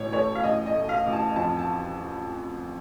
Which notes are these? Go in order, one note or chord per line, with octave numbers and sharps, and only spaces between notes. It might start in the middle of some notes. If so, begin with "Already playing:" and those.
Already playing: A1 A2 C#5
A3 C#5
F5
A1 D#5
D#5
A3
F5
A1
A5
F2 A5
A5